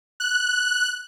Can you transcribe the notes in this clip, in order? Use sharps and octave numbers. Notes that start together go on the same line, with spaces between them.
F#6